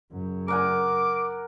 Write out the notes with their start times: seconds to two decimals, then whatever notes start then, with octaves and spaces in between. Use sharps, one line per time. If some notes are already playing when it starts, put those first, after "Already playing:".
0.12 F#2 C#3
0.48 A#4 F#5 G#5 D6